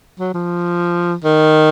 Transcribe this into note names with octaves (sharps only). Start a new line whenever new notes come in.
F#3
F3
D#3